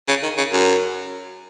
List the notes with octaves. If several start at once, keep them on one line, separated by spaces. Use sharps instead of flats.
C#3
D#3
C#3
F#2